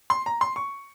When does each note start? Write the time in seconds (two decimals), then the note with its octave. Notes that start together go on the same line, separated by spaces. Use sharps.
0.10 C6
0.26 A#5
0.41 C6
0.56 C#6